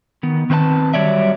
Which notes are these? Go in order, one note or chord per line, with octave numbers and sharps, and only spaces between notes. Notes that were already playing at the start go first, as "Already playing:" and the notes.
D#3 B3
D#3 C4 B4 D5 A5
F#3 G3 C#5 D5 E5